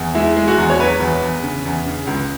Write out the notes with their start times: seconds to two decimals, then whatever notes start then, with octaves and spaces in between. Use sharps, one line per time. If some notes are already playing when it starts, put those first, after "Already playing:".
Already playing: E2
0.15 G#3 E4
0.37 G#3
0.48 F#4
0.58 E2
0.70 C#5
0.79 F#3 B4
1.00 E2
1.21 E2
1.43 C#3
1.65 E2
1.86 C#3
2.07 C#2